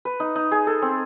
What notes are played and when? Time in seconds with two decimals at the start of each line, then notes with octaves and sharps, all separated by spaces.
0.05 B4
0.20 D#4
0.36 D#4
0.52 G#4
0.67 A4
0.82 C4